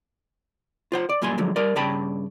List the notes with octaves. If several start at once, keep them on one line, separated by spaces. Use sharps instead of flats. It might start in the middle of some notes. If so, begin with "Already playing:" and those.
F4 C5 F#5
D5
F#2 A#2 G3 G#5 C6
D3 F3 F#3 G#3
G3 A#4 D5
G2 C#3 D5 G5 A5 B5